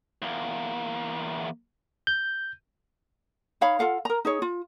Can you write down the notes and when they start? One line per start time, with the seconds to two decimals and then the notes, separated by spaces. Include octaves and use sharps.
0.22 E2 A#3
2.07 G6
3.61 D#4 C#5 F5 B5
3.79 F4 A4 F5 F#5
4.05 A#4 A#5
4.25 D#4 G#4 C#5
4.42 F4